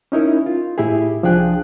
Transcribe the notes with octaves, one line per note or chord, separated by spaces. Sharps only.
C#4 D#4 E4 A#4
F4
A2 E4 G4 G#4
C2 F3 D4 G#4 G5 F#6